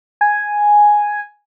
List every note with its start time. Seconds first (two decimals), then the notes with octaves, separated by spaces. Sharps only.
0.21 G#5